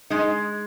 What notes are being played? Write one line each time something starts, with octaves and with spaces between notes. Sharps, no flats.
G#3 D#4